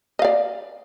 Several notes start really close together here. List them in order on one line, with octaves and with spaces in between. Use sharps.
D#5 F5 D5